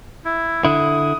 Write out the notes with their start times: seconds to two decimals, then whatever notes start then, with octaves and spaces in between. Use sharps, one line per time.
0.25 E4
0.65 D3 E4 D#6